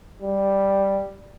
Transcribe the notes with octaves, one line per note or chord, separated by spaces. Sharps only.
G3